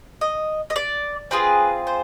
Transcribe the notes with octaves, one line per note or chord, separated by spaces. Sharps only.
D#5
D#5
D5
C4 F4 G#4 B4
C5